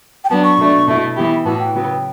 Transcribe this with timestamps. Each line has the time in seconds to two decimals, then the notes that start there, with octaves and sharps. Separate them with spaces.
0.24 G5
0.30 F#3 B3 D4 A5
0.44 C#6
0.59 B2 A3 D4
0.87 B2 A3 E4
1.16 E3 B3 E4 G4 B5
1.45 A2 E3 B3 F#4 A5
1.59 G5
1.74 C#3 F#3 B3